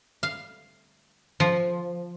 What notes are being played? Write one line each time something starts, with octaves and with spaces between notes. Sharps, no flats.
F5
F3